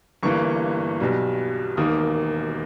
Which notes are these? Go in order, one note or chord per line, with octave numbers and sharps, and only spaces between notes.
G1 G2 E3 A#3 C#6
B1 B2 G3
E1 D#2 D#3 A#3 D#6